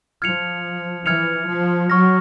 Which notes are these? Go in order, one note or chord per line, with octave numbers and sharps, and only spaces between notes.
F3 F6 G#6 C#7 F7
E3 F6 G#6 C#7 F7
F3
F#3 C#6 F6 A#6